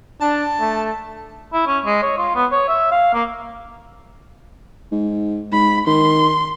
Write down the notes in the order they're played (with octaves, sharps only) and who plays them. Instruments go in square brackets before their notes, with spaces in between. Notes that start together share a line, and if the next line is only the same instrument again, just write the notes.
[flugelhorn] D4 [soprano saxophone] A5
[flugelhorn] A3
[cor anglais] E4
C#4
G#3
C#5
F4
B3
C#5
E5
F5
A#3
[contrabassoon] G#2
[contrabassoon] G#2 [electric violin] B5
[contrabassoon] D#3 [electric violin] C6